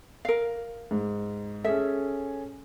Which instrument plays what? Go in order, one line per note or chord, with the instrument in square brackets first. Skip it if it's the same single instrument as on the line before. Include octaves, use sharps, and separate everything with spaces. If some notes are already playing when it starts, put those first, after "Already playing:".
[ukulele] A#4 F5
[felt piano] G#2
[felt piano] C#4 G#4 A4 [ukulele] E5